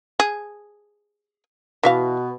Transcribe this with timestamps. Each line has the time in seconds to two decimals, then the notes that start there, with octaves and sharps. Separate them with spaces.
0.20 G#4
1.83 B2 E3 E5 F5